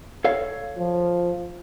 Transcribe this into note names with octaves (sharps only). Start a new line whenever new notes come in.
A4 C#5 F5
F3